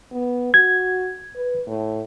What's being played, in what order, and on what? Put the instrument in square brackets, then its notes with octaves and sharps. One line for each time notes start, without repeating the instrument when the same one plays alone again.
[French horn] B3
[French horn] F#4 [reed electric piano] G#6
[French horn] B4
A2